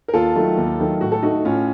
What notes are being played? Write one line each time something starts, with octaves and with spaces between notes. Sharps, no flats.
A#4
D#2 F4 A4
D#3 F#3 A3
D#2
D#3 F#3 A3
A2 F#4
A4
A3 D#4 F#4
A2 C#4 F4